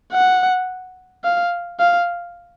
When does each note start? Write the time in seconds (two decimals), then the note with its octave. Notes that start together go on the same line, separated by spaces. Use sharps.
0.13 F#5
1.24 F5
1.80 F5